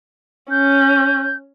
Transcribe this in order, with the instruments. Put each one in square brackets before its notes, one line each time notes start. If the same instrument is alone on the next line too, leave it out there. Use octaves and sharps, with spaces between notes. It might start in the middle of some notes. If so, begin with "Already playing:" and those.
[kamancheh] C#4 [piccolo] G6